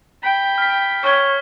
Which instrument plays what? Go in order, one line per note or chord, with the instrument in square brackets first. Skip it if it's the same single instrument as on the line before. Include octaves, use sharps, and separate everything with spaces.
[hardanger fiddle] G5 B5
[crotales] F6 B6
[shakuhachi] C#5 [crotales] C#6 G7